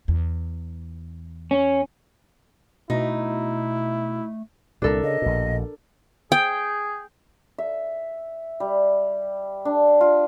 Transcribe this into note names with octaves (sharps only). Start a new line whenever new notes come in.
E2
C#4
B2 A3 D#4 E4
C2 A#2 D4 A4 A#4
C#3 D#5
A#1 B2
G#4 G5
E5
G3
D4
F4